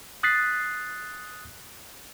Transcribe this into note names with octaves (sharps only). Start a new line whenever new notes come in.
D#6 F#6 A6 B6 C7